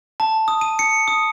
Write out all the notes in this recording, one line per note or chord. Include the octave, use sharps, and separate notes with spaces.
A5
D#6
D#7
C#7
D#6